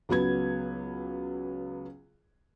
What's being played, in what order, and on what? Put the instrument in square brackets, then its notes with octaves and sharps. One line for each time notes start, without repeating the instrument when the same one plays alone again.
[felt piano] C#2 F#3 B3 G#6